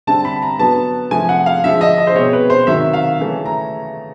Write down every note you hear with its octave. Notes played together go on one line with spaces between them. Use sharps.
D3 G3 C4 A5
B5
A#5
D3 F#3 B3 A5
C3 F3 A3 G#5
F#5
F5
D3 F3 G#3 E5
D#5
D#5
C5
B2 G#3 C4 C#5
B4
C5
C3 D#3 F#3 E5
F5
C#3 E3 A3 C#4
A#5